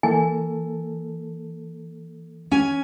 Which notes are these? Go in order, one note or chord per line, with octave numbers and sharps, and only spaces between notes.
E3 A#3 A4 G#5
C#4 G#5